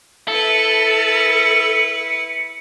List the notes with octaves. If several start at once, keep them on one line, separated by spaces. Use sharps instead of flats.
E4 A4 B4 C#7